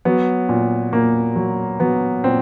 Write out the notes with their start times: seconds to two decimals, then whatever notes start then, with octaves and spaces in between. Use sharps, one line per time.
0.05 F#3 B3
0.49 A#2
0.93 A#2 A#3
1.36 F#3
1.80 F#3 B3
2.24 A#2 C4